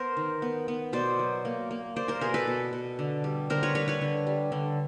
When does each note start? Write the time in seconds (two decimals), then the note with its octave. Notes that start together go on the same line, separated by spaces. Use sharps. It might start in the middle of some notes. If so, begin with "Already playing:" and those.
Already playing: B3 A#4 C5
0.17 D#3
0.42 B3
0.68 B3
0.93 B2 C5 D5
1.19 F#3
1.45 A#3
1.71 A#3
1.96 A#3 C5 D5
2.08 A#4 C5
2.21 B2 G#4 A#4
2.34 A4 B4
2.47 B2
2.73 B2
2.99 D3
3.24 G3
3.50 D3 A#4 C5
3.63 B4 C#5
3.75 G3 B4 C#5
3.88 B4 C#5
4.01 D3
4.27 G3
4.52 D3